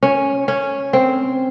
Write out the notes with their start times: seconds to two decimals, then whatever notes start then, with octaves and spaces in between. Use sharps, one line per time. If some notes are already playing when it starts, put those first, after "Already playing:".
0.02 C#4
0.48 C#4
0.93 C4